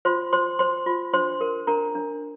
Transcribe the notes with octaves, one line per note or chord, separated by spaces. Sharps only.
F4 C5 C6
C5 C6
C5 C6
F4
D4 C5 C6
A#4
D4 A#4 A#5
D4